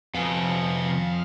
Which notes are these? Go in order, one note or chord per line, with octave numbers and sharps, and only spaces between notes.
F2 C3 B3 F5 G#5